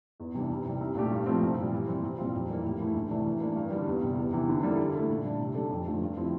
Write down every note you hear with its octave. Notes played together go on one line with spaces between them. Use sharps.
E2
C3 E3 G3 D4
C2
C3 G3
C2
A#2 A3 D4 G4
G2
F3 A3 C4
C2
A#2 G3
E3
G3 C4
C2
A#2 G3 C4 F4
F2
E3 G3 A#3
A2
E3 A3 E4
D2
C3 E3 A3 D4
E3
A#3 D4
G2
D3 G3
E2
C3 G3
E2
C3 E3
D3
G3 A#3 E4 A4
D3
A3 E4 A4
A#2
G3 D4
C3
G3 D4 A4
F2
D3 F3 A3
G2
F3 C4 E4